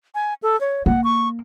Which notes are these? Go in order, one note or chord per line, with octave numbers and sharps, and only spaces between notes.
G#5
A4
C#5
A#3 F#5
C#6